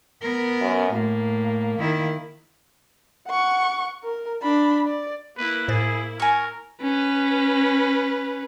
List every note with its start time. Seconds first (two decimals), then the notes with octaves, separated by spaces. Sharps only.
0.21 B3 A#4
0.61 F#2
0.93 A2 A#3
1.79 D#3 E4
3.27 F#5 C#6
4.03 A#4
4.42 D4 B5
4.87 D5
5.37 A#3 E4 B4
5.68 A2 G#4 C5 A6
6.20 A#4 G#5 C#6
6.82 C#4 B4